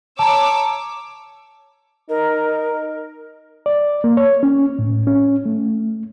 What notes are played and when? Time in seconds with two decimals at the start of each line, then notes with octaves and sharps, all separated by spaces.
0.19 C#5 A5 A#5 D6 E6
2.09 D#4 A#4
3.66 D5
4.04 A#3
4.17 C#5
4.43 C#4
4.79 A2
5.07 C#4
5.46 A3